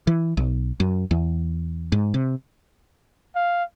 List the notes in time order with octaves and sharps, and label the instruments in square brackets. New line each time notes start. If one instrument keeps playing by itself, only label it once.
[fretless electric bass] E3
B1
F#2
E2
G#2
C3
[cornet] F5